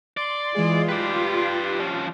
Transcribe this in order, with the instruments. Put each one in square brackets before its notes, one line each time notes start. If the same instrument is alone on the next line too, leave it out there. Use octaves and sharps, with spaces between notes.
[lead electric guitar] D5 [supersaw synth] C6
[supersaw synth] E3 G#3 G#4 [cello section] F4
[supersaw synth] G4 [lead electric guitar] B4 D5
[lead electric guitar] F3 C#4